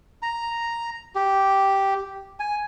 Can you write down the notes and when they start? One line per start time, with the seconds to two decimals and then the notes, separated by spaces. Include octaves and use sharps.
0.22 A#5
1.15 G4
2.40 G#5